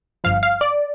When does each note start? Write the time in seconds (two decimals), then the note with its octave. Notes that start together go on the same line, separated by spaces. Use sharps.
0.24 G1 G2 F3 F5
0.43 F5
0.61 D5